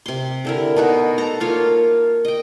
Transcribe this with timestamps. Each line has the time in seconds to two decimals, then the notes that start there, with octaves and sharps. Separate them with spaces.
0.06 C3 C6
0.45 D3 E4 A#4
0.76 B2 D#4 F#4
1.18 A4 A#5
1.40 A#3 F4 C#5
2.25 D#5 G5